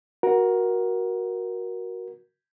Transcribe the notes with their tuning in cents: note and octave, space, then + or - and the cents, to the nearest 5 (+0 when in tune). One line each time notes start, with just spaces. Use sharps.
F#4 +0 A#4 +15